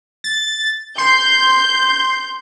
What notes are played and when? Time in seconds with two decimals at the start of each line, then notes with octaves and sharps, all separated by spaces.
0.24 A6
0.98 C6 G6